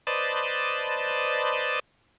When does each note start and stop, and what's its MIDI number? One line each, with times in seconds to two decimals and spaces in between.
0.07 1.79 71
0.07 1.79 72
0.07 1.79 74
0.07 1.79 75
0.07 1.79 81